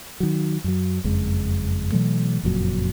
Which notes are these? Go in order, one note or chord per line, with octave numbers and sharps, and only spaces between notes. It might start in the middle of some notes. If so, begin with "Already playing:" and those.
D#3 F#3
F#2 F#3
F#1 F2 G#3
B2 E3 F#3 A3
F#1 F2 A#2 F#3